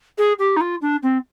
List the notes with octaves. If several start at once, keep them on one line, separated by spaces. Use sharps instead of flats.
G#4
G4
D#4
F4
D4
C4